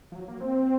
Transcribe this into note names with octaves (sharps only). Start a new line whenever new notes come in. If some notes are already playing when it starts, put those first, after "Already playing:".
F3
F#3
A#3
C4